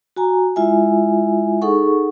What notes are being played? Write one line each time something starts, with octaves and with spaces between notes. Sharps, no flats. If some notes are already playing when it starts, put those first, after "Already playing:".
F#4 G#5 A#5
G#3 E4 F4 E5 G#5
D#4 G#4 A4 F#5 C#6